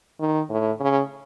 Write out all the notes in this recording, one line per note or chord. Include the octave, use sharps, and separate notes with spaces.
D#3
A2
C#3